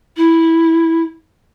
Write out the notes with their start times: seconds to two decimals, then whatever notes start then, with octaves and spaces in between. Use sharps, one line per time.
0.17 E4